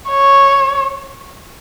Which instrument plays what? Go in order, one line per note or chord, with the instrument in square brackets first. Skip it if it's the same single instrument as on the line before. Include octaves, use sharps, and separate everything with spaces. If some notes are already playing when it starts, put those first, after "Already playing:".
[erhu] C#5